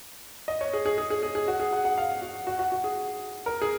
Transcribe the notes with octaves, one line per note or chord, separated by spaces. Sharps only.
D#5
C#5
G#4
G#4
G#4
G#4
G#4
G#4
F#4
G#4
F#5
F#5
F5
F#4
F#4
F#4
F#4
G#4
A#4
G#4